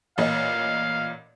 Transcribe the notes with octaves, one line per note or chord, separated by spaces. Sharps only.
A1 A#2 D#5 F5